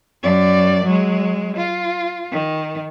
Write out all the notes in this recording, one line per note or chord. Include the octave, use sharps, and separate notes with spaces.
F#2 D5
F#3 G#3
F4
D#3